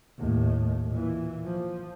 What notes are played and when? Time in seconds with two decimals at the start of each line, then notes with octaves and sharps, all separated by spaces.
0.18 D#2 A2
0.90 A#2 E3
1.44 F3